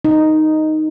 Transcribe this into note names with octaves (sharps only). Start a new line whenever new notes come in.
D#4